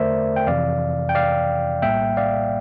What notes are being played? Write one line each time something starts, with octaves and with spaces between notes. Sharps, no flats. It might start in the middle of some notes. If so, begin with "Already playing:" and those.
Already playing: E2 D3 A3 A#4 C5 D5 E5
G5
F2 C3 E3 D5 F5
G5
D5 F5
A#1 A2 G3 A#3 E5 G5
D5 F5